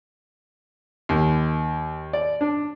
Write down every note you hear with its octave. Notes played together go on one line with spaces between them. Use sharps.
D#2
D5
D4